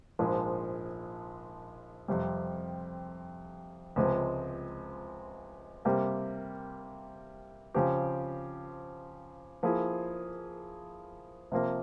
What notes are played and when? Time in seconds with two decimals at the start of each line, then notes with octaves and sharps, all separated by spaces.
0.19 A#1 G#2 F3 G#3
2.08 F2 C3 G3
3.96 C#2 C3 F3 G#3 C4
5.85 C3 G3 A#3
7.74 C#3 F3 C4 G4
9.63 F3 A#3 E4 G#4
11.52 C3 F3 A#3